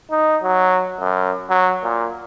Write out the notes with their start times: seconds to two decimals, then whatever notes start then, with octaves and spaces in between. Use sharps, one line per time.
0.11 D#4
0.43 F#3
1.00 F#2
1.50 F#3
1.83 A#2